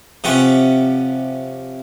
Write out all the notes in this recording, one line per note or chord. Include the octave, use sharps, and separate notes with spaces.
C3 F3 C#4 F#5